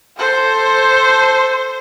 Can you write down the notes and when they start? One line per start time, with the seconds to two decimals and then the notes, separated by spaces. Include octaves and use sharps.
0.17 A4 C5